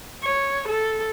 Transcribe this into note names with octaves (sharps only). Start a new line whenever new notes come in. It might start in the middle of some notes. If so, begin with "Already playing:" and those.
C#5
A4